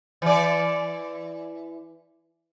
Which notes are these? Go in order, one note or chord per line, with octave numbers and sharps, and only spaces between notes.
E3 D5